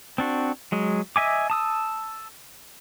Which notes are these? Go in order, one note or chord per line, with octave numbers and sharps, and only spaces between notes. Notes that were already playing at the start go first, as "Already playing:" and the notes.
C4 D4 F#4
F#3 G#3
D#5 E5 G#5 D6
A5 D#6 E6